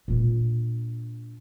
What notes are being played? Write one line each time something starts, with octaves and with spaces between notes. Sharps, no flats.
A#2 D4